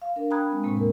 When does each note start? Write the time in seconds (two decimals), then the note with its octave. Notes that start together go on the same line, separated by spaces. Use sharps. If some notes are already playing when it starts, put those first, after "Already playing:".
0.02 F5
0.16 D4 A#4
0.30 G5 A#5 B5 D#6 F#6 G#6
0.50 G#3 C4
0.64 A2 C3 G#3 A#3 C4
0.76 E2 A#4